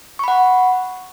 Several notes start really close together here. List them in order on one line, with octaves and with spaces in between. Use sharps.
C#6 B5 F#5